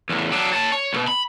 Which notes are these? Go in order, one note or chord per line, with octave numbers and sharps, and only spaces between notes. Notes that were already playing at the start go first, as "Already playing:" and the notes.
E2 A2
F#3 D4
C#5 A5
C#5
C2 B2
B5